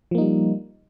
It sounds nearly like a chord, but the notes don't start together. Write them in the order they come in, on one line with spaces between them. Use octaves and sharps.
F3 A#3 D#4 G3